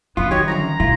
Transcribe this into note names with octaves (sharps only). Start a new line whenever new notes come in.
D#3 G3 B3 F4
F#3 D#4 G4 C#5
F#2 D3 F3 A#5
A#1 B2 E4 F4